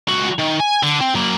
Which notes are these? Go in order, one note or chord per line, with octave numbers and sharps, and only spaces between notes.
C#2 F#4
D#3
G#5
D3
C4
F#3 A#3